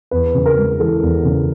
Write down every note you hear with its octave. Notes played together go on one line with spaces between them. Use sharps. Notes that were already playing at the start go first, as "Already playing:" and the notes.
E2 B4
C#3
A#4
G#3
E3 A4
E2
C#3